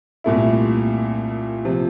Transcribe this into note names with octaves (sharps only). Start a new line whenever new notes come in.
C2 A#2 A3 E4
C3 F3